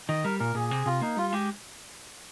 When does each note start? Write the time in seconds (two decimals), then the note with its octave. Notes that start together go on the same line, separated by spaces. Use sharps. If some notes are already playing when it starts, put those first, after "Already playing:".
0.09 D#3 D#5
0.24 G3 A#4
0.39 A#2 A#4
0.55 A#2 G#4
0.71 C3
0.86 C3 F4
1.01 A#3 D#4
1.17 G3 F4
1.33 G#3 G4